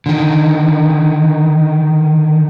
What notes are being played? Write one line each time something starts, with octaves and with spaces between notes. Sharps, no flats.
D3 D#3